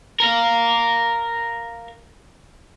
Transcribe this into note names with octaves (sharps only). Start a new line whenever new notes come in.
A#4 F5